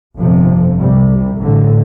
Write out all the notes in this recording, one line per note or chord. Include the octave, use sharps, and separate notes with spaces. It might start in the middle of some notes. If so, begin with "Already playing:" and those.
G1 F2 C3 F3
C2 C3 G3
A1 A2 D3